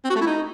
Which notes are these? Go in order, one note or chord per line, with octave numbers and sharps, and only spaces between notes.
C4
F#4
A3
E4
D#4